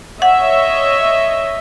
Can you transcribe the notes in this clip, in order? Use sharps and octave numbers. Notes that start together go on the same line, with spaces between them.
C#5 D#5 E5 F#5